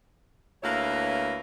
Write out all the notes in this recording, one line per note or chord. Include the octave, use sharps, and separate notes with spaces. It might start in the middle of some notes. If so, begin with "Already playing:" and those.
D2 A#3 E4 B4 C#5 F5